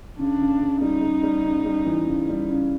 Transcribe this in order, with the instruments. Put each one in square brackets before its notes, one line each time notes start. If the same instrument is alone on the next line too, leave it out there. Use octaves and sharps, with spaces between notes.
[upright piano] C#3 [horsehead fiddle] D4
[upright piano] C#3
C#3
[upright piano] G3 [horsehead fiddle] D#4
[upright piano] G3
G3
C#3
G3
E3
C#3
G3
C#3